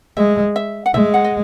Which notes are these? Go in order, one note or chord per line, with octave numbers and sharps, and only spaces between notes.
G#3 E5
E5
F#5
G#3 E5
F#5
D#5